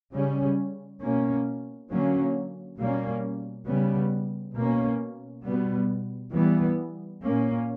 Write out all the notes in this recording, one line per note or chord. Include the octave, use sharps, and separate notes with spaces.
C#3 G3 C#4
B2 A#3 C#4
D3 F#3 A#3 C#4
B2 G3 A#3 C#4
C#3 G3 B3
B2 A#3 C#4
B2 G3 B3
E3 G3 B3
A#2 A#3 C#4